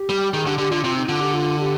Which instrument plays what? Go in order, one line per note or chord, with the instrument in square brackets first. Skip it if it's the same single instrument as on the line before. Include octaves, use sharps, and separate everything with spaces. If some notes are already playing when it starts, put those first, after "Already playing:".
Already playing: [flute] G4
[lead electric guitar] G3
[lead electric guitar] D#3 [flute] G#4
[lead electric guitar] D3 [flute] G4
[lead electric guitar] D3 [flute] G4
[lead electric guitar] D3 [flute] F4
[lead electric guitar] C3 [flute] F4
[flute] D#4
[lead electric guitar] D3 [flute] F4
[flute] G4
F4
G4